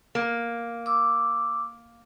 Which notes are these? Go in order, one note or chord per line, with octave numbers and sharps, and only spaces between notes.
A#3
D6 E6